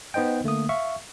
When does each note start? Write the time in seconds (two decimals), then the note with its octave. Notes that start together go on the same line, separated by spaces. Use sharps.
0.14 B3 D#4 C5 D#5 G5
0.44 D3 A3 A#3 D#6
0.69 E5 F5 C#6